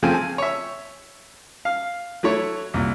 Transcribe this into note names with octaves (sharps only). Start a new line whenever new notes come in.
C#3 F3 A3 C4 G5 G#5
G#5
C#5 E5
F5
F#3 A3 E4 C#5
C2 A#2